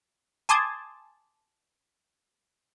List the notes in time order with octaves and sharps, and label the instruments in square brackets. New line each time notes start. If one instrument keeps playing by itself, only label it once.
[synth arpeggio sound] G#5 A5 C6 D6 D#6 G#6